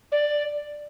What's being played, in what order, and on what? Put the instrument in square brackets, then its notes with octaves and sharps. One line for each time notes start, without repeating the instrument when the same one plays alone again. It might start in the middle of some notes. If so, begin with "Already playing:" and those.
[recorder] D5